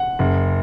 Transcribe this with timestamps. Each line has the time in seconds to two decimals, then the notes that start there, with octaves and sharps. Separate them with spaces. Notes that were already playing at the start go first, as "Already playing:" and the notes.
Already playing: F#5
0.19 F#1